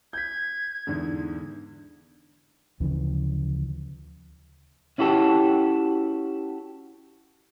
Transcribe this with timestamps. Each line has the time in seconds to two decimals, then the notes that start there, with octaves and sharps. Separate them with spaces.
0.13 G6 G#6 B6
0.87 E2 G#2 D3
2.80 D2 C#3 E3 F3
4.98 C#4 E4 F#4 G4 A4